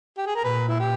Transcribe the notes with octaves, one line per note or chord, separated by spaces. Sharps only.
G4
G#4
A#4
A#2 B4
E4
G4